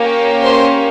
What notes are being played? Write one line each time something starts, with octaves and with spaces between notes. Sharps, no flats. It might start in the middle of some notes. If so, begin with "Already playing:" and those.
Already playing: A#3 C#4 G4
C5 C6